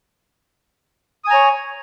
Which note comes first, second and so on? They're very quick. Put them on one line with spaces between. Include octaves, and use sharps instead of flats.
D#6 G#5 A#5 C#5